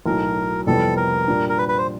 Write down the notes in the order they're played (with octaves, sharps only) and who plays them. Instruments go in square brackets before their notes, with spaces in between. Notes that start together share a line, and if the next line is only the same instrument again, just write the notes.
[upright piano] B1 A2 F#3 [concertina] A#4
[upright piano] F2 C3 E3 G3 B3 [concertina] A4
[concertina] A#4
[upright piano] A#2 G3 A#3 D4 F4
[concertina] A#4
B4
B4
C5